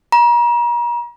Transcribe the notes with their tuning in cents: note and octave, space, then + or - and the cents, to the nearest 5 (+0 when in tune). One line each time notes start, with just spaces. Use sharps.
A#5 +40